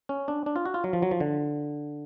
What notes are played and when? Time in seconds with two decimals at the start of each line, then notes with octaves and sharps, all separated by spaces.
0.09 C#4
0.28 D4
0.46 D4
0.56 F4
0.66 F#4
0.74 F4
0.84 F#3
0.93 F3
1.02 F#3
1.11 F3
1.20 D3